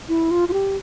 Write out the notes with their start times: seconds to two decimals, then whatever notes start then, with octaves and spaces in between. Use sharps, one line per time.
0.09 E4
0.31 F4
0.48 F4
0.53 G4